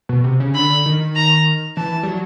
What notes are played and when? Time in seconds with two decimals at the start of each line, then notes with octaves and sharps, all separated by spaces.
0.09 B2
0.24 C3
0.40 C#3
0.55 D3 B5
0.86 D#3
1.16 A#5
1.76 E3 A5
2.03 G3
2.08 F#3